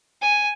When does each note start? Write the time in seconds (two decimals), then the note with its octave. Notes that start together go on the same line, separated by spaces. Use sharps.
0.22 G#5